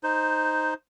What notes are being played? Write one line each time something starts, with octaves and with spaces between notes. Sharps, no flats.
D#4 C5